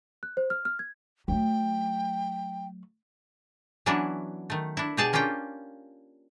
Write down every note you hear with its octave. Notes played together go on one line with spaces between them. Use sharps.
F#6
C5
F6
F6
G#6
F#3 A3 G5
E3 F#3 B3 C#4 D4 E4
D#3 A3
D4 E4
B2 G4 G#4 D5 A5
A#3 C#4 D4 F4 G5